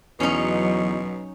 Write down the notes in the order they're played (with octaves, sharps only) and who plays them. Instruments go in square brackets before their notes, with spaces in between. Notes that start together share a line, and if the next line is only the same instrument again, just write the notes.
[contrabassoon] E2 [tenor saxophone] B2 [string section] F#3 [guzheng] C#4 D#4